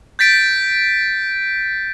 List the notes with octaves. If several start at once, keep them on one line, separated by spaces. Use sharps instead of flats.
G6 A6 B6 D7